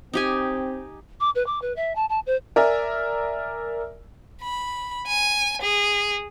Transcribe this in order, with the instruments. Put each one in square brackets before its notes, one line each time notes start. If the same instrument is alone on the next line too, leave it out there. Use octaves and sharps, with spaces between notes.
[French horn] C4 [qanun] D#4 G4 G#5
[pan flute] D6
B4
D6
B4
E5
A5
A5
C5
[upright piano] A#4 D5 E5 G#5
[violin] B5
G#5
G#4